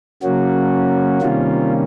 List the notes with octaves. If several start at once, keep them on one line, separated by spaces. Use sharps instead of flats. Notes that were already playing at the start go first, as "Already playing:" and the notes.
C#3 F#3 A#3 C#4 F#4
C3 D#3 G3 A#3 C#4 F4